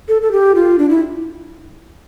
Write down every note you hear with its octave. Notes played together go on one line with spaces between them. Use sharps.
A4
A4
G4
F4
D4
E4